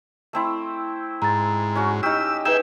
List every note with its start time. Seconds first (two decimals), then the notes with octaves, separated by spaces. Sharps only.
0.33 A3 C4 E4
1.22 G#2 A#5 A6
1.76 C#4 F#4
2.03 D#4 G4 E6 F6 G6
2.45 D#4 G#4 B4 E5 G5 E7